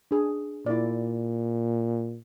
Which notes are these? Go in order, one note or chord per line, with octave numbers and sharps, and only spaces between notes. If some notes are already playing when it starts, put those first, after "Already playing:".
D4 G#4
A#2 E4 D5